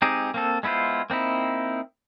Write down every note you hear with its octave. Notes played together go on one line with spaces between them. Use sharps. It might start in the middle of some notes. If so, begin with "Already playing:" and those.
G#3 C4 D#4 G4 G#4
A#3 C4 A4
G#3 B3 E4 F4 C5
A#3 C4 D#4 E4